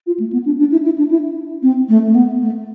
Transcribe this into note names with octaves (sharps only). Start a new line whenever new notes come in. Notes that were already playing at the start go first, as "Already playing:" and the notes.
F4
A3
B3
D4
D4
E4
E4
D4
E4
C4
A3
A3
B3
A3